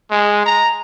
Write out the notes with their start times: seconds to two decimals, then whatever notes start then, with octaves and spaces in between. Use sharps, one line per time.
0.11 G#3
0.46 A#5